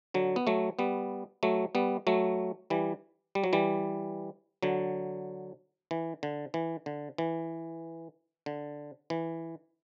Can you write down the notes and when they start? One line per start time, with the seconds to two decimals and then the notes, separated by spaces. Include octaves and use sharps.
0.14 D3 F#3
0.36 B3
0.47 F#3 A3
0.79 G3 B3
1.43 F#3 A3
1.75 G3 B3
2.07 F#3 A3
2.70 E3 G3
3.35 G3
3.44 F#3
3.53 E3 G3
4.63 D3 F#3
5.91 E3
6.23 D3
6.54 E3
6.86 D3
7.18 E3
8.46 D3
9.10 E3